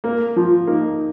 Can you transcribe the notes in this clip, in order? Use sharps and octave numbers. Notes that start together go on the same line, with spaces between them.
A#3 A#4
F3 F4
A#3 D#4